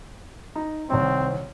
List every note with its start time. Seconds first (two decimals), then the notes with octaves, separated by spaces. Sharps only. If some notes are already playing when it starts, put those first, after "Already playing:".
0.56 D#4
0.90 C2 D#3 C4 C#5